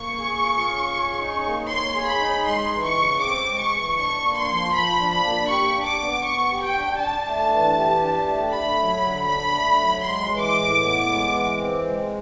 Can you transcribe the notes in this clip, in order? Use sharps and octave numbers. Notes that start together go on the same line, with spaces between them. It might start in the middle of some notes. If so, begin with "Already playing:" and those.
Already playing: A#3 C#6
G#4
F4
C#4
G#4
D#4
A#3
C#5 C6
G#4
B5
D#4
G#3 C6
E3
C#6
C#3
C4 D6
G#3
C#6
E3
D4 C#6
A#3
C6
F3
F3 B5
D4
B5
A#3
G4 C#6
D4
D6
B3
B3 C#6
G4
G5
D4
D4 A5
A3
E3
G4
D4
A3
A3 B5
F#3
D3
D4 B5
A3
F#3
G#3 C6
E3
D6
A2
B3
G#3
E3
C4
G#3